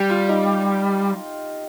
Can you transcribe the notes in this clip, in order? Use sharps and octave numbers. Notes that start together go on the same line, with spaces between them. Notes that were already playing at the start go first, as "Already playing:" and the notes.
Already playing: G3 G4
F4
D#4